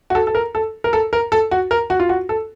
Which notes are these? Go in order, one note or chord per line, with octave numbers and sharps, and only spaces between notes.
F#4
A4
A4
A#4
A4
A#4
A4
A#4
A4
F#4
A#4
F#4
F4
F#4
A4